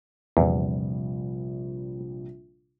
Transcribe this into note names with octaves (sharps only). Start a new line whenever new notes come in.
A#1 E2 C3 G3